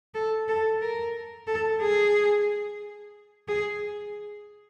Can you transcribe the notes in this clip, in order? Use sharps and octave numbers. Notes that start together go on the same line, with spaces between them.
A4
A4
A#4
A4
G#4
G#4